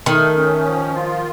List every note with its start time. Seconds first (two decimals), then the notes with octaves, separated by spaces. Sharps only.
0.06 D#3 A3
0.36 C#4
0.65 F3
0.95 F4